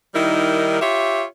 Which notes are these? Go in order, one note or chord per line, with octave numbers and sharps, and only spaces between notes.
D#3 G3 D#4 E4 A#4
F4 G4 C#5 E5